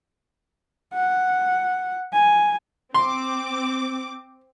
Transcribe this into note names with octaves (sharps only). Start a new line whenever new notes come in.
F#5
G#5
C4 C6 D6